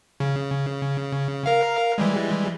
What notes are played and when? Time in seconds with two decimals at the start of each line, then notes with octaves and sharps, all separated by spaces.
0.20 C#3
1.46 A#4 F5
1.98 E3 G3 G#3